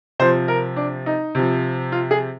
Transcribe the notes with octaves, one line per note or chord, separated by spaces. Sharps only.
C3 F3 C5
A#4
D4
D#4
C3 F3
F4
G#4